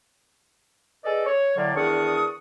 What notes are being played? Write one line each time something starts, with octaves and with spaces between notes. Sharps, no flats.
G#4 A4 B4 D5 D#5
C#5
A2 D3 F#3 A#3 D5
E2 D#3 D4 D5 C#6 D#6